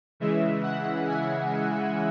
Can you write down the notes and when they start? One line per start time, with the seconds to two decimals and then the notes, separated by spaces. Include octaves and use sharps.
0.20 C#3 E3 G#3 E5
0.63 F#5
1.07 G#5